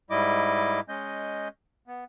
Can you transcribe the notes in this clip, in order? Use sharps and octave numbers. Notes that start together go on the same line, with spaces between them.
G#2 G3 E4 D#5 D6
G#3 C#4 D#5 G6
B3